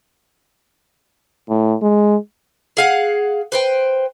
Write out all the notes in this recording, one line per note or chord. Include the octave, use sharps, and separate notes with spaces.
A2
G#3
G#4 F5 F#5
B4 C5 G5